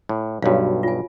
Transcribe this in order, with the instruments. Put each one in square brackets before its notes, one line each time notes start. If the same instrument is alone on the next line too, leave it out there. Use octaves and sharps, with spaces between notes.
[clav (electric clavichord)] A2
[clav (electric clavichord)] B1 G2 [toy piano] F#4 C#5 F5
[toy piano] F4 G#5